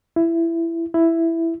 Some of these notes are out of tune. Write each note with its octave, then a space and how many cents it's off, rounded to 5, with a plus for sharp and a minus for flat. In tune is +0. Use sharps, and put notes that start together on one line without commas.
E4 +15
E4 +5